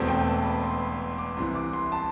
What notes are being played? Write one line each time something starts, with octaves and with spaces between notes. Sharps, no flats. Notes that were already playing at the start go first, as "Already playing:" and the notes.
Already playing: E1 E2 B2 A3 C4
G5
A5
B5
C6
B5
C6
D6
C2 C3 E3 C6
D6
C6
A5